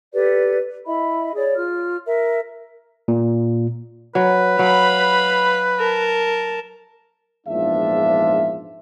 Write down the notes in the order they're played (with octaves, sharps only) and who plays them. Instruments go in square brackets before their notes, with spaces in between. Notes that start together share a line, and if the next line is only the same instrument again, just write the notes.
[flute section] G4 A4 B4 D5
E4 D#5 E5 B5
G#4 C#5 D5
F4 F6
A#4 E5
[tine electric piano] A#2
[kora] F#3 [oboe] B4
[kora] F#3 [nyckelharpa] F5 B5
[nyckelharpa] A#4 A5
[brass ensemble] A#1 E2 G#2 D4 F4 E5